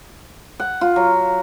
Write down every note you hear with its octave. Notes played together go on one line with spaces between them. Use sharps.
F#5
F4
F#3